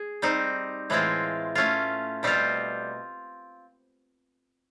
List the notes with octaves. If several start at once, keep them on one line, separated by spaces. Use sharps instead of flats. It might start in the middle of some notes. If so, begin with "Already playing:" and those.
Already playing: G#4
G3 C4 D#4
A2 E3 G#3 C4 F4
A3 C#4 F4
B2 G3 C4 F4